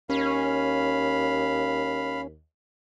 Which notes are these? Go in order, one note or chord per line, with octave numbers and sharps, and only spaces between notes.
D#2 C#4 F5 B5